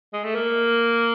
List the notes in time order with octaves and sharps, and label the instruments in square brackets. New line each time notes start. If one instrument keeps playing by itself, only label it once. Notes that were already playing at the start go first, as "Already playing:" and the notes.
[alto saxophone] G#3
A3
A#3